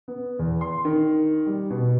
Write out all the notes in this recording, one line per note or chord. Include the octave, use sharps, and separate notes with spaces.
B3
E2
C6
D#3
G3
B2